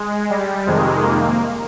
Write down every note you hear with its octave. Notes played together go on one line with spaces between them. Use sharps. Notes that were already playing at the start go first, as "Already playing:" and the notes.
Already playing: G#3
G3
F2 C3 D#3 G#3
A#3